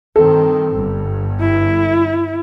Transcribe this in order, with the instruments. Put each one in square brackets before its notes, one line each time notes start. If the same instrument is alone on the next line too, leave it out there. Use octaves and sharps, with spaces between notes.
[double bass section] G2 D#3 C4 [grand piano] A4
[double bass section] G1 G2
[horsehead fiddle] E4